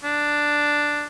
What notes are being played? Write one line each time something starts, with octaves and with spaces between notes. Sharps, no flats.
D4